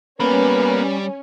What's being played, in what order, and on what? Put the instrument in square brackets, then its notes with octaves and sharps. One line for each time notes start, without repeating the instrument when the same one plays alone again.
[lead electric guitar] G3 B5 [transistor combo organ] A#3 B3 [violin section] C#4 [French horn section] B4